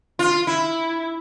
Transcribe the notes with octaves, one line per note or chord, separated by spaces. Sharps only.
F4
E4